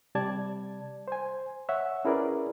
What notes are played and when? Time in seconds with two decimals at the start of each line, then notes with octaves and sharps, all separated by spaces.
0.15 C3 G3 D5 A5 G#6
1.08 C5 G#5
1.69 C#5 E5 F#5
2.05 C#4 E4 G#4 A#4 B4 D5